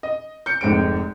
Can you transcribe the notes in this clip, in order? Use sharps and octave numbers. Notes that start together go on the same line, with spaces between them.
D#5
G6 C#7
F1 G#2 C4 D7